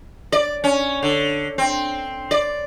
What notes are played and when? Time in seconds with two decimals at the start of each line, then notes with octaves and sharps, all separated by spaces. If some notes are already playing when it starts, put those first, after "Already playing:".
0.32 D5
0.64 C#4
1.03 D3
1.58 C4
2.31 D5